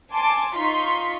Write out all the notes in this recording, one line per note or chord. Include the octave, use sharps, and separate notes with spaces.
G#5 A5 C6 D6
D#4 F4 C6 C#6 B6